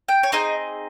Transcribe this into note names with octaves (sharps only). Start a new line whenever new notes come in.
G5
C#5
C4 D#4 G#4 D#5